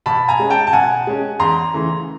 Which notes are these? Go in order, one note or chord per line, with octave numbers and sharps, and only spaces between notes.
B2 A5 B5
G#5 A#5
G#3 C#4
G5 A5
A5
B2 F#5 G#5
G#3 C#4
E2 A#5 C6
C#3 E3 A3